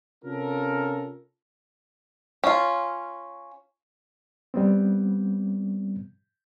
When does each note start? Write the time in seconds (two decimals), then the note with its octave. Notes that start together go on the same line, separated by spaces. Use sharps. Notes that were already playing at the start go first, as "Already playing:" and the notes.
0.24 C3 C#4 F4 A4 A#4
2.44 C#4 F4
4.54 G3 B3 C4